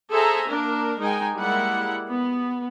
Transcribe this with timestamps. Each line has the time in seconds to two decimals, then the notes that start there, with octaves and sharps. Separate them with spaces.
0.11 G#4 A4 C5 E5 G#5 A#5
0.49 A#3 D4 A#4
1.00 G#3 D#4 G5 G#5
1.35 G3 G#3 A#3 E4 F#5
2.09 B3